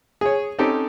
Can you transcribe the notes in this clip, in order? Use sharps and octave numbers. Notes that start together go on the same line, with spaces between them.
G#4 C#5
C4 C#4 D#4 G4 A4